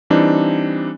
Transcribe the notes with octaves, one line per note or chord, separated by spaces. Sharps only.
E3 G3 C4 D4 D#4